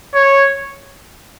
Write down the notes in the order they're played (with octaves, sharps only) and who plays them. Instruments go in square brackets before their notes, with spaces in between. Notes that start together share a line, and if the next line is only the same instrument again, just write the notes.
[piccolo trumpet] C#5